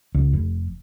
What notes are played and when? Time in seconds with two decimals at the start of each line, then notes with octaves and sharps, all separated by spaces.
0.15 C#2
0.33 F1